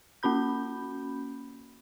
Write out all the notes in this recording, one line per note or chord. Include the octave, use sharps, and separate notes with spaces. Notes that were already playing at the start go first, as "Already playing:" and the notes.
A#3 C#4 F#4 B5 G6